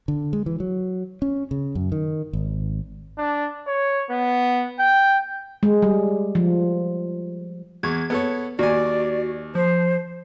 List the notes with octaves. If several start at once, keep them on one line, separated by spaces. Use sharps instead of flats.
D3
G#3
E3
F#3
C#4
C#3
F#2
D#3
G#1
D4
C#5
B3
G5
G#3
G3
F3
E2 C#6 G#6
B3 A4 C#5
D#2 F#4 D5 G#5
F3 C5